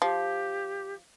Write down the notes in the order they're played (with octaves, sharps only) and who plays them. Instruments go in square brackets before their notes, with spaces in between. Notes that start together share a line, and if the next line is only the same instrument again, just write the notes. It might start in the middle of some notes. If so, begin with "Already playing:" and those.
[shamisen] F3 [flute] G4